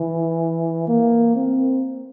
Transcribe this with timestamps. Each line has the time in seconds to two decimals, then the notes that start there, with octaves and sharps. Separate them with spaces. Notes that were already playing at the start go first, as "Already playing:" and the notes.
Already playing: E3
0.88 A#3
1.36 C4